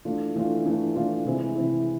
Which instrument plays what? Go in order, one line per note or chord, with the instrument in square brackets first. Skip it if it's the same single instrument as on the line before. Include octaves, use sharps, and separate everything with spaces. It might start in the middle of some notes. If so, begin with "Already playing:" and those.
[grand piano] E3 A3 D4 F4
E3 A3 D4 F4
E3 A3 D4 F4
E3 A3 D4 F4
C3 E3 G#3 C4 E4
C3 E3 G#3 C4 E4